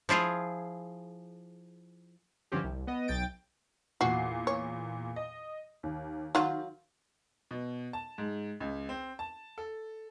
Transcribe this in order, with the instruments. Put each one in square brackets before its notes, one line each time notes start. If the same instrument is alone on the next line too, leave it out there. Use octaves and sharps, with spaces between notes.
[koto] F3 E4 F4 G#4
[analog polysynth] G2 D3 F3 C4 C#4 G4
C2
B3 D#5
B1 G5 A6 D7
[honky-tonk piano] E2 A#2 C7 [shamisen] F#4
[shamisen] C#5
[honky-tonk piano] D#5
D#2
[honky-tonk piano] D#3 [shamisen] F#3 F4
[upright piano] B2
A5
G#2
C#2
C4
A5
A4